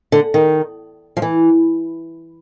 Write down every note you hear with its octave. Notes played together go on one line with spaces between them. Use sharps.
D3
D#3
F3
E3